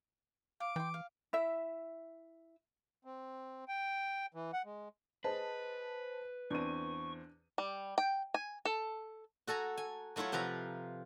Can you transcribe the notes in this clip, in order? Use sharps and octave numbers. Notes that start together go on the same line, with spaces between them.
F5 D6
E3 G5 C6
F5
E4 E5
C4
G5
E3
F#5
G#3
G#4 B4 C5 D#5 A5
E2 C4 D4 C#6 D#7
G3
G5
G#5
A4
F#4 A4 G#5 A#5
G#5
F#3 A3 E4 F4 C#5
C3 F3 F4 B4 A#5